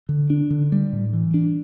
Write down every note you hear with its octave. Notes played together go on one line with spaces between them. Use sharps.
D3
D4
D3
G3
A2
E3
D4